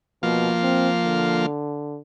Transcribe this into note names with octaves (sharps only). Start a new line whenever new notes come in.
B2 F3 A#3 F5
C4
D3